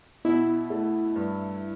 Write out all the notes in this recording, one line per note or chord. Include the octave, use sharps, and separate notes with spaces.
B2 E4
A3
G2